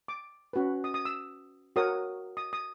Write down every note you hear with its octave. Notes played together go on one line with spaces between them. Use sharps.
D6
C#4 F#4 B4
D#6
D#6
E6
F#4 A#4 C#5 D#6
D#6
D#6